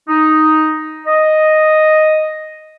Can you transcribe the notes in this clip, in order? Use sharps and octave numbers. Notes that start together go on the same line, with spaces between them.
D#4
D#5